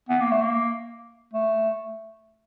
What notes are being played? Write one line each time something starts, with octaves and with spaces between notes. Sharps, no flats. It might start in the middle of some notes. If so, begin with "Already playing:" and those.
B3
A#3
A3
A#3
A3